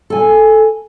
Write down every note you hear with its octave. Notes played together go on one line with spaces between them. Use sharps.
A4 G#5